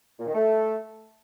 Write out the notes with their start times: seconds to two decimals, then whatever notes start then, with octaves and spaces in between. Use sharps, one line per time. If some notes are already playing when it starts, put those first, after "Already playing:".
0.20 A#2
0.27 D#3
0.34 A3